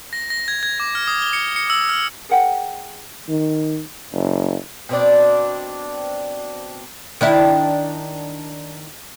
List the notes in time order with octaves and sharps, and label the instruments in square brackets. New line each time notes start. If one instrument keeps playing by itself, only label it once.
[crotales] A#6
A#6
G#6
G#6
D6
F6
D#6
G7
C#7
C#7
E6
F6
[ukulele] G#4 A#4 F#5 G5
[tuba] D#3
F#1
[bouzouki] B2 C4 D4
[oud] D#3 D4 E4